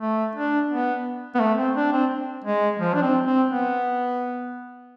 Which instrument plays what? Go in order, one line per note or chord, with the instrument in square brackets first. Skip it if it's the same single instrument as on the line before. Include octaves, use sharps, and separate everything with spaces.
[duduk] A3
D4
B3
B3
A3
C4
D4
C4
G#3
F3
D4
C4
C4
B3